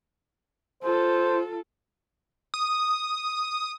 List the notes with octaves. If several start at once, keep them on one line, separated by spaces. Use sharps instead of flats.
F4 A4 C5
D#6